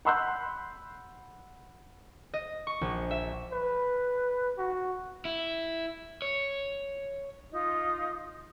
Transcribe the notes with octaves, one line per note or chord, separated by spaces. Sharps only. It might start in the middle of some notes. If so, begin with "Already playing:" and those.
F#5 B5 C6 E6 F#6 G6
D#5
C#6
A#1
E5
B4
F#4
E4
C#5
D#4 F4 D#6